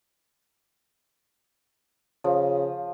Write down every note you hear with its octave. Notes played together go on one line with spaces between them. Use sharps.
C#3 F3